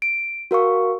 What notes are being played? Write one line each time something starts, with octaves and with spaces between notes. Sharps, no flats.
D7
F#4 A#4 F5 C#6